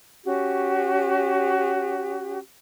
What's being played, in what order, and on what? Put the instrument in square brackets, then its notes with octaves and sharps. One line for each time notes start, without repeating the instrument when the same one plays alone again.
[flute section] C#4 F#4 G4